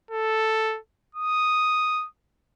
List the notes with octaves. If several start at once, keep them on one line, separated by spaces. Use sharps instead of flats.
A4
D#6